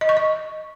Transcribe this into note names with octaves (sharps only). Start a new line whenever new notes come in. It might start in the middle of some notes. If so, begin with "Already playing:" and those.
D#5
C#6
D#5